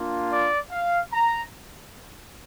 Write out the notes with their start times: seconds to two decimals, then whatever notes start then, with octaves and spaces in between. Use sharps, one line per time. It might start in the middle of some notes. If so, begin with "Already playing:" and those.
Already playing: A#3 D4 F4
0.31 D5
0.72 F5
1.13 A#5